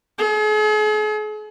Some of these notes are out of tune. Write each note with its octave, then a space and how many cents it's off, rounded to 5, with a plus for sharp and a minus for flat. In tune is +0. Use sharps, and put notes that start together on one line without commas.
G#4 +45